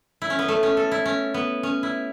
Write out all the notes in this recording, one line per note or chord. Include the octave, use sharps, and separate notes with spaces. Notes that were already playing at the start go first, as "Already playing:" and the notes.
E4
C#4
B3
A3
C#4
A4
E4
C#4
B3
C#4
E4